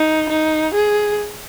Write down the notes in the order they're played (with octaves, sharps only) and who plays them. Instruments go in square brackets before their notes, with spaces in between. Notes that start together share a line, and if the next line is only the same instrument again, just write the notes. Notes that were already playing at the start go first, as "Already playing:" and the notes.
Already playing: [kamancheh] D#4
D#4
G#4